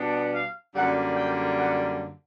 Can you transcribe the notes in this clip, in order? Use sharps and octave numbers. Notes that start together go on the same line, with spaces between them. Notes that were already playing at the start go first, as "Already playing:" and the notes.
Already playing: B2 G3 B3 D4
F5
F#2 D3 G3 A#3 F#5
G5
F#5